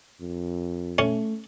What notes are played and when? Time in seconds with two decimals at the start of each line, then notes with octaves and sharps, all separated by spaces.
0.21 F2
0.98 A3 C#4